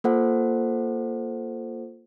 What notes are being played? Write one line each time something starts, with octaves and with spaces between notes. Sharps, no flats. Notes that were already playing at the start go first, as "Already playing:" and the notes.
A#3 F4 A4 C5 F#5